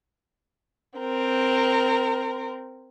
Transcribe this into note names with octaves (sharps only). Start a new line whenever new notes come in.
C4 A#4